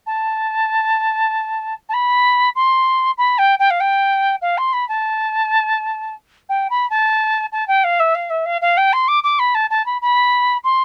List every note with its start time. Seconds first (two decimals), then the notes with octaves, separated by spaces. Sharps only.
0.06 A5
1.89 A5
1.93 B5
2.55 C6
3.17 B5
3.38 G5
3.59 G5
3.70 F5
3.80 G5
4.41 F5
4.57 C6
4.73 B5
4.88 A5
6.49 G5
6.70 B5
6.90 A5
7.52 A5
7.67 G5
7.84 F5
7.99 E5
8.15 F5
8.30 E5
8.45 F5
8.61 F5
8.77 G5
8.93 C6
9.08 D6
9.23 D6
9.39 B5
9.54 A5
9.70 A5
9.86 B5
10.01 B5
10.64 C6